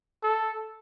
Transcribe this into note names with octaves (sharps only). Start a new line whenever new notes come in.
A4